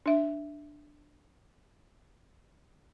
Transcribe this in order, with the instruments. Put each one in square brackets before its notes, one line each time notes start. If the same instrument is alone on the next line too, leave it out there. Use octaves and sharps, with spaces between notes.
[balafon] D4 E5